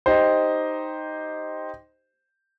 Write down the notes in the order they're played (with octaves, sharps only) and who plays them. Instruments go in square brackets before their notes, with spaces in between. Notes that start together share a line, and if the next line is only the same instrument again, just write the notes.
[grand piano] D#4 G4 C5